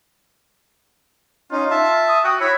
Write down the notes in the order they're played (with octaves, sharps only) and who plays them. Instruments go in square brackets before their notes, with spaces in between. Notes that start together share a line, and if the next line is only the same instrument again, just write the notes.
[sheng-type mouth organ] C#4 D#4 [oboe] F4
[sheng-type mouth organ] E5 A5
[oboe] D#6
[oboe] F#4 [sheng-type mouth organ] G5 D#6
[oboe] E4 [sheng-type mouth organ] C#5 B5